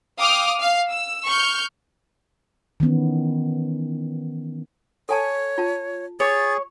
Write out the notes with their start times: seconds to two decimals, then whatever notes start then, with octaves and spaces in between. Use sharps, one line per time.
0.19 F5 G5 D6 D#6 F6
0.59 F5
0.89 E6
1.27 C#6 F6 G6
2.80 D#3 E3 B3 C#4
5.09 A4 C#5 G#5 A5
5.58 F4 A5
6.20 G#4 C#5 A6